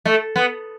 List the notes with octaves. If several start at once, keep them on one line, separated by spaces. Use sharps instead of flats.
A3
B3